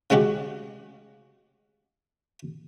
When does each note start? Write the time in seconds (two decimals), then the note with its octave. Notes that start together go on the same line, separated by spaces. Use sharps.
0.10 C#3 G#3 C#4 F#4 G4